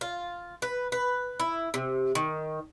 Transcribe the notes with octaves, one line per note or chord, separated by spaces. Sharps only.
F4
B4
B4
E4
C3
D#3